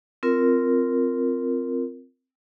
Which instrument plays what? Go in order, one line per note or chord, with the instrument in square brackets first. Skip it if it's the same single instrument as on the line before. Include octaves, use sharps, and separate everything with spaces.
[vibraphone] C4 F4 A#4